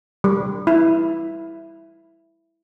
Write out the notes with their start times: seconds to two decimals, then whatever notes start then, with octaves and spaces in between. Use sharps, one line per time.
0.24 G3
0.67 E4